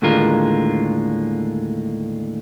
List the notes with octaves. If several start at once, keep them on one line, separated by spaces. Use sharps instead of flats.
D#2 A2 D3 G#3 F4 A#4